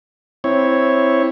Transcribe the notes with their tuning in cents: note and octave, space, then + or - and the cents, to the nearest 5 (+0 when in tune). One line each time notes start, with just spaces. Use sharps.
C4 +5 E4 +0 C#5 +0